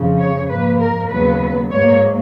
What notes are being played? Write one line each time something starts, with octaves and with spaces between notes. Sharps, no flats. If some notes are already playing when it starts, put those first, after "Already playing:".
Already playing: F2 C#3 F3
C#5
G#2 F3 A#3 B4
A#4
D#2 C#3 F#3 B3 B4
G#2 F#3 A#3 C#5